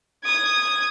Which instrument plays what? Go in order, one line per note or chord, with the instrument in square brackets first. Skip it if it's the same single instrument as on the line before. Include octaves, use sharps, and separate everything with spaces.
[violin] D#6 G#6